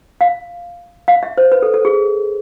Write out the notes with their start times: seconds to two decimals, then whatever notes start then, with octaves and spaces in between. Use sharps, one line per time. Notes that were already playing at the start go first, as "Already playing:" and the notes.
0.21 F5
1.08 F5
1.23 E5
1.37 C5
1.52 B4
1.62 A4
1.74 A4
1.85 G#4